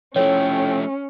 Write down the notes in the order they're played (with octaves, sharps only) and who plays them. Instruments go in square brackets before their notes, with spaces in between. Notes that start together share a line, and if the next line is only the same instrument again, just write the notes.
[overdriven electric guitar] F3 A3 [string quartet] C#4 [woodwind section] E4 A4 G5 [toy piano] C#5